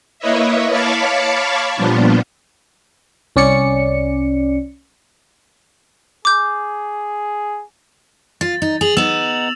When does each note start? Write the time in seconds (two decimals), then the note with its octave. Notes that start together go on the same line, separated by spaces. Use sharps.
0.19 A#3 E4 B4 C#5 D#5 E5
0.69 C#5 F5 A5 B5 C#6 D6
1.76 A#2 F3 G3 B3 D4 F4
3.36 C2 C#4 D5 C#7
6.25 G#4 D6 G6
8.41 F4 A6
8.62 D#4
8.81 G#4 F7 F#7
8.97 B3 D#4 E6 E7